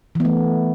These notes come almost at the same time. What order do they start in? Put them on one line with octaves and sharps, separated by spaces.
E3 B3 A3